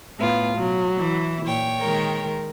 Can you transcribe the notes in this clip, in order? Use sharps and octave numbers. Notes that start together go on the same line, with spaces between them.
A2 B3 F4
B2 F#3
E3 E4
A#2 C#5 G5
D#3 G#3 A#4